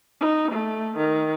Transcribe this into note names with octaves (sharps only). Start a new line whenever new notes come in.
D#4
A3
D#3